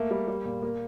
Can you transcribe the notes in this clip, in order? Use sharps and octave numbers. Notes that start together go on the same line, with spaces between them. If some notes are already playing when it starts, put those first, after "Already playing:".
Already playing: A3 A#3
G3
G3
A#2
A#3